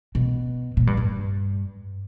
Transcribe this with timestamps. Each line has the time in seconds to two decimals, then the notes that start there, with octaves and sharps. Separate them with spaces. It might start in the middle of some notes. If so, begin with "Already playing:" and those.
0.15 B2
0.77 A#2
0.87 G2
0.97 G2